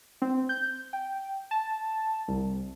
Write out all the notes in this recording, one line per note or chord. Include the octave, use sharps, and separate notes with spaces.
C4
G6
G5
A5
C2